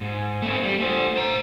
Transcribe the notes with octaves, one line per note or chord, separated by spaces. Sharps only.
G#2
A3 C4
G3
A3 C5
C5 A#5